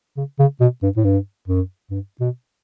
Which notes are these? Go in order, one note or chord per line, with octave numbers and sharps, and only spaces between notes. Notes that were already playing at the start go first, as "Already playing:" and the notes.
C#3
C#3
B2
G2
A2
G2
F#2
G2
B2